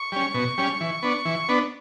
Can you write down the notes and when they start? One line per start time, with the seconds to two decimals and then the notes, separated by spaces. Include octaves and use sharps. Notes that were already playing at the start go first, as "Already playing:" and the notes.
Already playing: C#6
0.12 G3 C#4
0.34 B2
0.58 G3 C#4
0.81 E3
1.03 B3 D4
1.25 E3
1.49 B3 D4